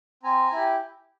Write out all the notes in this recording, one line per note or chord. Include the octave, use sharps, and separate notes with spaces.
C4 G#5 A#5
E4 G4